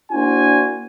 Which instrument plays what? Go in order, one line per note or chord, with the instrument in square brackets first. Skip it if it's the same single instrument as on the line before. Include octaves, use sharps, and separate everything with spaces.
[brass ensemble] A#3 D4 E4 F#4 C5 G#5